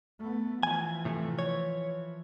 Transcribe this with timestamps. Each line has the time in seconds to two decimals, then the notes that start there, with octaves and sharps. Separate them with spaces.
0.19 A3 B3
0.63 E3 F3 G#5
1.05 A2 C3 A3
1.39 C#5